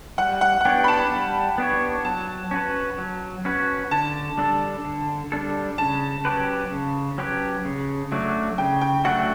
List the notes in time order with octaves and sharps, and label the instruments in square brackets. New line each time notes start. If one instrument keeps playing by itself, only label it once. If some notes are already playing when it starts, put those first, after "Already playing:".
[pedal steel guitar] G3 [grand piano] F#5
[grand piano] F#5
F#5
[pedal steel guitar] B3 D4 G4 C#5 [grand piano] G5
[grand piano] B5
A5
[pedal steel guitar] G3
B3 D4 G4 C#5
[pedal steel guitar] F#3 [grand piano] A5
[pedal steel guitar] C#4 F#4 B4
F#3
C#4 F#4 B4
[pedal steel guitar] D3 [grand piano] A5
[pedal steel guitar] G3 D4 A4
D3
G3 D4 A4
[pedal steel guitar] C#3 [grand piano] A5
[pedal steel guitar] F#3 C#4 G4 B4
C#3
F#3 C#4 G4 B4
C#3
F#3 A3 D4 F#4
[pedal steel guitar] C#3 [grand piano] G5
[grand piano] G5
[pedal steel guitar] F#3 A3 D4 F#4 [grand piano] F#5